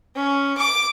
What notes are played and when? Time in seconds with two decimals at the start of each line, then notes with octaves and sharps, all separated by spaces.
0.16 C#4
0.58 D6